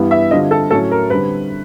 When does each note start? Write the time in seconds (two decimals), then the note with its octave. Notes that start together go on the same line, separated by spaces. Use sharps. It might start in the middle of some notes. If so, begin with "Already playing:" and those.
Already playing: G2 E3 G3 B3
0.11 E5
0.31 D3 G3 C4 F4 D#5
0.51 A4
0.71 A2 F#3 A3 C#4 A4
0.91 A#4
1.10 D3 G3 C4 B4